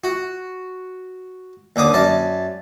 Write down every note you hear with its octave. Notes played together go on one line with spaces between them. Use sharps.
F#4
D#2 D3 D6 D#6
F#2 D5 A5